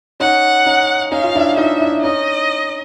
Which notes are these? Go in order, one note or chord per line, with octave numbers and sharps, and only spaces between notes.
C#4 D#4 F#5
C#4 D#4
C#4 D#4 F5
F4
D4 E4
D#4 F4 E5
D4 E4
C#4 D#4 D#5